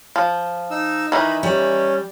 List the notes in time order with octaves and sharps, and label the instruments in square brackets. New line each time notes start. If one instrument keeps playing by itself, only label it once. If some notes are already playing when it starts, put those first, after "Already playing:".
[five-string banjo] F3
[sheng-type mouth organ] D#4 E6
[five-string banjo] D#3 E3 [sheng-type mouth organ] D#4 B5
[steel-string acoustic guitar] G3 [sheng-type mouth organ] C#4